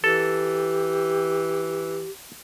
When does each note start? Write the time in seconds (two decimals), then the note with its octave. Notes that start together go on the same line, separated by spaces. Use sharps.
0.04 E3 G4 A4